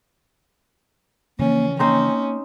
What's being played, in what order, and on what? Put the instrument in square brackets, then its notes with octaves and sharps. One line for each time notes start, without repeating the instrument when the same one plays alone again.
[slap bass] C#3 E3 F3 [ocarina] A#3 [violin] C#4
[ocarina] A#3 [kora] C4 D#4 C5 [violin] C#4